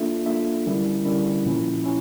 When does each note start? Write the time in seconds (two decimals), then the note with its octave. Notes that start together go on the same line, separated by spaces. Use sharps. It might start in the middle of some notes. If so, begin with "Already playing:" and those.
Already playing: A#3 D4 F4 A4 E5
0.26 A#3 D4 F4 A4 E5
0.66 D3 G3 C#4 E4 A#4
1.05 D3 G3 C#4 E4 A#4
1.45 A#2 F3 C#4 E4
1.84 C#4 E4